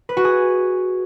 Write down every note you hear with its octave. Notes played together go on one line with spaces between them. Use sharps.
B4
F#4
G#4